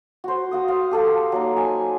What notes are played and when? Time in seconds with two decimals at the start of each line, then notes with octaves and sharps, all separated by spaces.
0.24 F#4 C5
0.51 F#4 F5 D#6
0.68 F5
0.91 G4 A4 F5
1.32 F#3 A#3 D#4
1.57 G#5